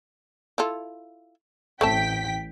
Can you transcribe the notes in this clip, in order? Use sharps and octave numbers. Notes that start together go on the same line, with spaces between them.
E4 F4 A4
A1 A3 C4 G5 A5 B6